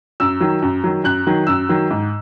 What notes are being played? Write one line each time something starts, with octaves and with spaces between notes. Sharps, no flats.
F#2 E6
D#3 F#3
F#2
D#3 F#3
F#2 F#6
D#3 F#3
F#2 E6
D#3 F#3
G#2